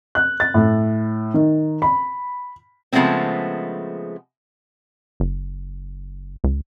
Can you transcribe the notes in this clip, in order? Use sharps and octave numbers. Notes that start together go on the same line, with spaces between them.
F#6
A6
A2
D#3
B5
C#3 F3 G#3 A3 B3 C4
F#1
C#2